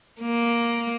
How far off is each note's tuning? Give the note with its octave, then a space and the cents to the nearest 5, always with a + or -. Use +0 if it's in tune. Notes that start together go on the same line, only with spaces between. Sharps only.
A#3 +10